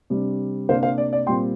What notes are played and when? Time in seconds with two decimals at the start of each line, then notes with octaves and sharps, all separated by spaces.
0.10 C3 G3 D4
0.69 C3 A#3 D4 C5 F5
0.83 C5 F5
0.98 D5
1.13 D5
1.27 A#2 G3 C4 G5 C6